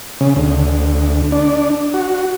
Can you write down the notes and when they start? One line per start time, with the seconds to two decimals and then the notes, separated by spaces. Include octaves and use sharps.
0.21 C#3
0.36 D2
1.32 D4
1.94 F#4